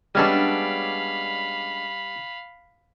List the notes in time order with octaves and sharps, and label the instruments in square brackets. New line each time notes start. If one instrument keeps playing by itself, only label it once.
[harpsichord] G3 C#4 A4 [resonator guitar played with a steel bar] G#3 B3 D4 [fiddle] F5 B5